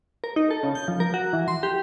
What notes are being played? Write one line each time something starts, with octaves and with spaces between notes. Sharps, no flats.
A#4
D#4
A4
C#3
G6
F3
A#4
F#4
E3
C6
G4